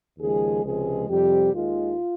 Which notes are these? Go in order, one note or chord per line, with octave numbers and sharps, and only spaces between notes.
D#2 C#3 F3 G#3 G#4
C#2 C3 F3 G#3 G#4
F2 C3 G3 G4
D#2 D#3 G#3 F4